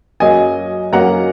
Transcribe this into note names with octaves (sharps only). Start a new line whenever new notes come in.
F#2 F#3 A#3 C#4 D#5 G#5
F#2 F#3 A#3 C#4 F#5 A#5